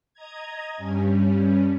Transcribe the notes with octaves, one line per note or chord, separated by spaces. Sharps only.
D#5 A#5 G#6
G2 G3 C#4